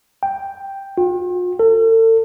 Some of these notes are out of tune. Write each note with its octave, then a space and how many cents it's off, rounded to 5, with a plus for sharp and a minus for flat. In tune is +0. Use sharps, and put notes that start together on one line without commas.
G5 +5
F4 +45
A4 +40